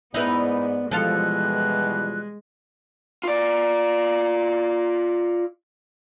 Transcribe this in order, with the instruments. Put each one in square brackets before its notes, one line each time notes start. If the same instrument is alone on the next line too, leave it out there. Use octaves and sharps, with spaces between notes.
[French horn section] G#2 D5 [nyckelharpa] B3 [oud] D#4 E4 B4
[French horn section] B2 E3 G3 [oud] F3 A4 F5 [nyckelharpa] G#3 [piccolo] F#6
[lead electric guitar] F4 D5